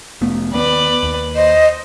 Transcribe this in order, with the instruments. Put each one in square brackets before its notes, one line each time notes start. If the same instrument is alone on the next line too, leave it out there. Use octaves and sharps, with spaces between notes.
[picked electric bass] F1 A3 B3
[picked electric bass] D#2 A#3 B3 [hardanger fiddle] B4 D5
[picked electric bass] D#2
[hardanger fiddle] C5 [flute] D#5